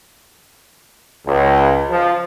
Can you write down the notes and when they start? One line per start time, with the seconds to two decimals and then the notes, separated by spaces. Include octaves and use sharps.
1.27 C#2
1.90 F3